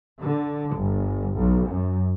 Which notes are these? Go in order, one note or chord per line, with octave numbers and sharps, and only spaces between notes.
D3
G1
B1
F#2